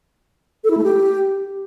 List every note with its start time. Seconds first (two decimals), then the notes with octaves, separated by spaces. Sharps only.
0.64 A4
0.71 E4
0.77 A3
0.84 G4